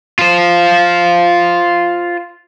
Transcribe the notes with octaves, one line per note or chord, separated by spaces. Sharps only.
F4 C5